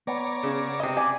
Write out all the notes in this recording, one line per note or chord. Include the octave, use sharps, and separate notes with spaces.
B3 C#5 D5 A#5
C#3
C3 D#5
D5 G#5